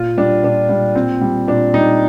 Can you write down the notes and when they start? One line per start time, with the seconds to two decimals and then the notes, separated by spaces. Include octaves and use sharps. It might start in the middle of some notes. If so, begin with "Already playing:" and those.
Already playing: A#2 F4
0.18 G3 D4
0.43 A#2 D4
0.69 G3
0.95 A#2 C4
1.21 G3
1.47 A#2 D4
1.74 G3 D#4